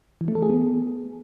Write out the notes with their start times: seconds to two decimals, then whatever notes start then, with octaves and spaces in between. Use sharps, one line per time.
0.21 E3
0.28 A3
0.35 A4
0.42 G#4
0.50 B3